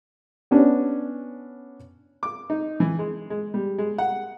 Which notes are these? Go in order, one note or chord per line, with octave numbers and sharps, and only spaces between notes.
B3 C#4 D4
D6
D#4
E3
G#3
G#3
G3
G#3
F#5